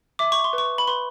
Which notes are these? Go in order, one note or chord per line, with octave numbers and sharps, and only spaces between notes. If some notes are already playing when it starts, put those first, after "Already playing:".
E5 D6
C#6
C6
B4
C#6
B5
B4 C6